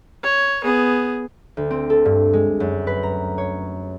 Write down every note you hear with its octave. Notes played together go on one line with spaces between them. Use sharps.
C#5
B3 G#4
D2
C4
A4
G2
G#3
F#2
B4
A#5
C#5